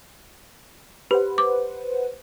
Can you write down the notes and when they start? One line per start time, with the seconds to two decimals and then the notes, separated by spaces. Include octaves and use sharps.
1.11 G4 B4 C5 F#5
1.38 D6